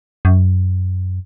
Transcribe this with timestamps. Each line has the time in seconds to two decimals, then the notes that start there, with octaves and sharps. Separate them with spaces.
0.25 F#2